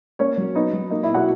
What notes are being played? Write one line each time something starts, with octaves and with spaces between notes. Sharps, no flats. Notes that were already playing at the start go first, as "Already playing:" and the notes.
A#3 C#4 C#5
F#3
B3 D#4 D#5
F#3
A#3 D#4 D#5
E4 E5
B2
F#4 F#5